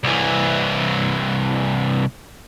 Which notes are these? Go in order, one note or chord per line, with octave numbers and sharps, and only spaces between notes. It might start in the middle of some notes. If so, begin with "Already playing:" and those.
C2 E3